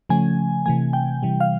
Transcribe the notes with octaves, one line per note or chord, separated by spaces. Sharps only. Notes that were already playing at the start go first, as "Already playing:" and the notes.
C#3 F3 A3 C#4 G#5
C3 E3 A3 G#5
G5
C3 E3 G3
F5